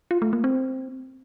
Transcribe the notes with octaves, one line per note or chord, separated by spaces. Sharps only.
F4
A3
A#3
C4